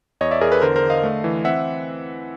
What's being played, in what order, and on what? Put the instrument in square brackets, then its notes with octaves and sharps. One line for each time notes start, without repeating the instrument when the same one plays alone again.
[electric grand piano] E2 C#5 D#5
D5 E5
E2 G#4 A#4
A4 B4
D3 A#4 C5
A#4 C5
D3
D#5 F5
A3
E3
C4 E5 F#5